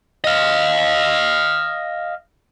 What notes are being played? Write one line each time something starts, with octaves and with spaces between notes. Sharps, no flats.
D#5 F5